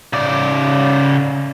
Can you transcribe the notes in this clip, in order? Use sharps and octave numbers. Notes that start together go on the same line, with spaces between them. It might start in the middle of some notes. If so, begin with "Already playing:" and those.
C#3 D5